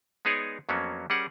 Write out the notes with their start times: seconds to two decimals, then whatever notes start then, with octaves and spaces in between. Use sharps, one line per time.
0.25 G#3 B3 D#4 G#4 C#5 D5
0.69 F2 F#3 A#3 B3 C#4
1.10 G3 C#4 G#4 A#4 F#5